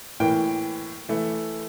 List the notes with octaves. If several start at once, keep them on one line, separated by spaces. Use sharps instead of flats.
A2 E3 A#3 G5
E3 A3 E4